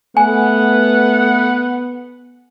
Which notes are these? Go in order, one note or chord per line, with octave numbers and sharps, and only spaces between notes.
A3 B3 F#5 G#5